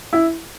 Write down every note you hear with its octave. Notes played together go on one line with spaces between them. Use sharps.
E4